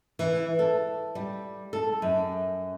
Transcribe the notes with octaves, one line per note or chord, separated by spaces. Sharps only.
E3
A4
G3
A4
F#2